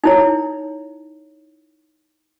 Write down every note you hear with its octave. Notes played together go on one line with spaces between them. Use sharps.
D#4 E4 C#5